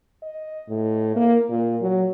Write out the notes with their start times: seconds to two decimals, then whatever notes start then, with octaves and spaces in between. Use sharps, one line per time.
0.23 D#5
0.69 A2
1.16 A#3
1.50 A#2
1.81 F#3